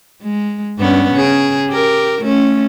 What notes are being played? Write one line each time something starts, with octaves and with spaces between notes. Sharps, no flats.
G#3
G2 B3 C#4
C#3 G#4
G4 A#4
A3 C#4